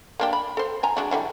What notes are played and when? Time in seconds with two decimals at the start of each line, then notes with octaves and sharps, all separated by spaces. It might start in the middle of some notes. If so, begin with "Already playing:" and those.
0.20 A#3 D4 G4
0.33 B5
0.57 A4 C5
0.83 F3 G#5 A#5
0.97 G#3 D4 F#4
1.11 D3 E3 G3